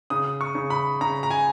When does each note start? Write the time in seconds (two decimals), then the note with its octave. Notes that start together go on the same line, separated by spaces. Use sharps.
0.10 C#3 D#6
0.41 C#6
0.55 C#3
0.70 B5
1.01 C#3 A#5
1.23 A#5
1.31 G#5